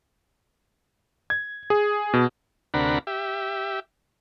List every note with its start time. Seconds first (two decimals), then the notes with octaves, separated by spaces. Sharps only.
1.30 G#6
1.70 G#4
2.14 B2
2.74 D2 C3 D4 A#4 F#5 B5
3.07 G4 E5